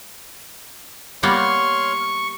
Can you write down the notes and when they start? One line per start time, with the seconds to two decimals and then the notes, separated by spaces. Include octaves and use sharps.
1.23 G3 A#3 B3 C#5 C6 C#6 F6